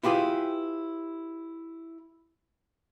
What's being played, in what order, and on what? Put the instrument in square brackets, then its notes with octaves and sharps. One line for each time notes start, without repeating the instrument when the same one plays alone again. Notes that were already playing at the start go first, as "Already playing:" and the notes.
[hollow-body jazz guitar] E4 F4 G4 G#4 B4